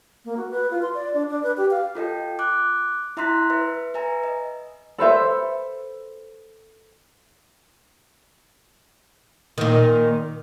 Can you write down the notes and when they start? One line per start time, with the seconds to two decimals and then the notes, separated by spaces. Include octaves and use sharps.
0.25 A#3
0.37 F#4
0.50 B4
0.71 F4
0.82 C6
0.94 D5
1.14 D4
1.28 D4
1.43 B4
1.57 G4
1.71 F5
1.95 F4 A4 D#5 G5
2.39 D6 F#6
3.17 E4 E5 A#5 C6 F#6 B6
3.50 B4 E5
3.94 B4 E5 G#5 A#5
4.24 D#5
4.98 A4 B4 C5 E5
9.58 A#2 D#3